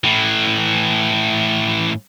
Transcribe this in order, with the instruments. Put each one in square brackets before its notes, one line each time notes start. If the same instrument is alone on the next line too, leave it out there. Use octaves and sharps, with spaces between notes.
[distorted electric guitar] A2 E3